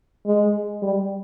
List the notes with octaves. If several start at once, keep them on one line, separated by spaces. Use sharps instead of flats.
G#3
G3